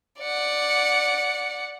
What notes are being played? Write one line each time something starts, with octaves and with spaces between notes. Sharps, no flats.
D5 F#5